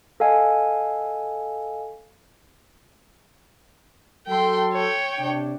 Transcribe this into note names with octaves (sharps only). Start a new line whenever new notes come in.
A4 D#5 F5 G#5
F#3 A4 G5 C6
C#5 G5
C3 D4